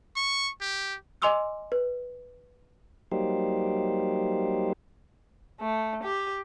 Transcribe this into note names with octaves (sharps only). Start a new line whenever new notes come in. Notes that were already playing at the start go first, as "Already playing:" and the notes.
C#6
G4
D#5 G#5 C6 D6 E6 F6
B4
F#3 G3 A#3 D#4 G4 C5
A3
G4